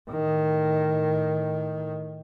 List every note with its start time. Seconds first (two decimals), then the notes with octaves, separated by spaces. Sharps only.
0.11 A2 D#3